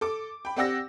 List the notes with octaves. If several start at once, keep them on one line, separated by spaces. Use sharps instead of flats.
A4 D6
G5 B5
C4 G4 D5 F#5 E6 A#6